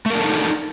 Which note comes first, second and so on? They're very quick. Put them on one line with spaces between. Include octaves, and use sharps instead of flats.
A3 A#4 D4 A4 D#4